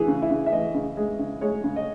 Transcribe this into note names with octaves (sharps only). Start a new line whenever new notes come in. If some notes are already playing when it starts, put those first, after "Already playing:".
Already playing: E3 G#4
C#3
E4
C#3
E5
E3 D#5
C#3
G#3
C#3
G#3 C#5
C#3
D#5